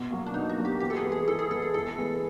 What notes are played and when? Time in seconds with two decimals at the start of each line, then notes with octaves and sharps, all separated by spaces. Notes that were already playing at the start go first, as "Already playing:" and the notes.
Already playing: B2
0.11 F#3 A#3
0.27 D4
0.34 B2 D#4
0.50 F#4
0.57 F#3 A#3
0.65 G4
0.80 E3 G4
0.90 A4
0.97 G#4
1.05 G#3 B3
1.12 G#4
1.27 E3 A4
1.39 G#4
1.50 G#3 B3 A4
1.62 G#4
1.74 E3 A4
1.98 G#3 B3